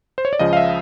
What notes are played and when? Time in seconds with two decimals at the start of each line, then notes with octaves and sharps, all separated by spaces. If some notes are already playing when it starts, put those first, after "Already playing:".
0.18 C5
0.25 C#5
0.33 D5
0.39 C#2 C#3 F3 D#5
0.53 F5
0.57 E5